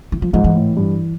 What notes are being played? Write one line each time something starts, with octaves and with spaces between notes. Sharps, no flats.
E3
F3
G#2 F3
E3
A2
G2